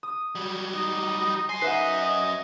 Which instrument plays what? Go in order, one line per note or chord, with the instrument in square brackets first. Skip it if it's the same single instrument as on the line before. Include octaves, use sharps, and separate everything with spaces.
[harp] D#6
[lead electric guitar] F#3 G3
[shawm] D#4
[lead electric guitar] F#2 G#5 [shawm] C6
[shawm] D#4 [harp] B4 E5 F#5
[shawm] D#5